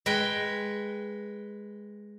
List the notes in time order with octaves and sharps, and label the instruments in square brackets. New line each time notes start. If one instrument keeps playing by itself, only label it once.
[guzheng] G#3 B4 G5